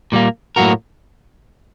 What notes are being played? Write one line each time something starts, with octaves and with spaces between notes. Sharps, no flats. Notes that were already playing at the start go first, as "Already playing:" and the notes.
A#2 G3 A#3
A2 F#3 A#3 F#4 A#4